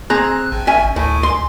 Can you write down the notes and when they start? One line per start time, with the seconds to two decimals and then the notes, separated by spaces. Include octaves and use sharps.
0.10 C4 G#4 A#5 F#6
0.52 G#1
0.67 C#4 E5 G#5
0.96 D2 A2 G#5
1.23 C6